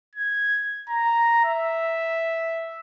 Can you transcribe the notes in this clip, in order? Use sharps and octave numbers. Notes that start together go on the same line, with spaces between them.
G#6
A#5
E5